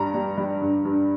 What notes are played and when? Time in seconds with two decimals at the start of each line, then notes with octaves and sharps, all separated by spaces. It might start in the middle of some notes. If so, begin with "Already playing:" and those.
Already playing: G2 G3 A#5
0.14 G3
0.38 G3
0.61 G2
0.85 G2